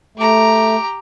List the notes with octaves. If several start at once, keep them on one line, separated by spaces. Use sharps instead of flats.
A3 G4 A#5